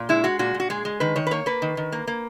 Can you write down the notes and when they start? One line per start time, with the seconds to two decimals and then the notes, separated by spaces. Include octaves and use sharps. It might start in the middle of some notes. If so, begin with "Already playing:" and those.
Already playing: A#2
0.09 G#3 E4
0.24 G#3 F#4
0.39 A#2 F#4
0.54 A#2
0.60 F#4
0.70 G#3 G#4
0.85 G#3
1.00 D#3 B4
1.16 D#3 C#5
1.27 B4
1.31 A#3 C#5
1.46 A#3 B4
1.62 D#3
1.77 D#3
1.92 A#3
2.07 A#3